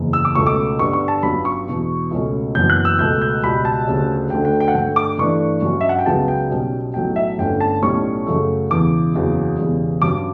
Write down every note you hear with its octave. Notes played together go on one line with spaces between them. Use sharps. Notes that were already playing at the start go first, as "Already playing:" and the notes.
Already playing: F#1 E2 C#3
E6
D6
C#2 B2 A3 C#4 C#6
D6
G2 D3 G3 B3 D4 C#6
C#6
A5
G1 G2 F#3 C#4 B5
C#6
E1 E2 B2
C#2 B2 A3 C#4
F#1 F#2 E3 B3 G6
F#6
E6
C#2 B2 A3 G6
G6
C#2 B2 G3 B5
A5
D2 C#3 G3 C#4
D2 D3 A3 G5
G5
G5
F#5
G2 D3 A3 G5
D6
G2 E3 A3 D4 C#6
G2 F#3 C#4
E5
F#5
G5
C#2 C#3 F#3 B3 A5
G5
B1 B2 G3 C#4
B1 A2 F#3 G5
E5
G1 G2 D3 A3 C#4 G5
A5
B1 A2 G3 C#4 C#6
F#2 C#3 F#3 A3
E1 E2 C#3 E3 D6
F#1 E2 C#3 F#3
E1 E2 C#3 G3
G2 F#3 C#4 D6